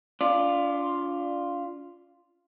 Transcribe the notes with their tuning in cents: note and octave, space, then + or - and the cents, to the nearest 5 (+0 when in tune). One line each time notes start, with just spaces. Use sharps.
D4 -45 F4 +0 D5 +15